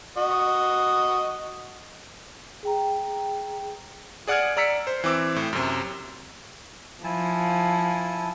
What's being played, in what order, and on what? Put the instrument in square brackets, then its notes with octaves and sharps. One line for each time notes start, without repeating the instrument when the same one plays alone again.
[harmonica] F#4 D#5
[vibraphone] G#4 G5 A#5
[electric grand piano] G#4 D5 F#5 D#6 F6 G#6
D5 A#5 E6 B6 C#7
C5
E3 C4 D6 E6
A2
F#2 C3
[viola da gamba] F3 [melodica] E4 G#5 A5